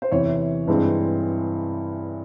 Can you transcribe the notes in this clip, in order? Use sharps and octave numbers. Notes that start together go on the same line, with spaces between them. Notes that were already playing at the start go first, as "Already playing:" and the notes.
C5
E2 C3 E3 C#5
G2 E3 G#3 C4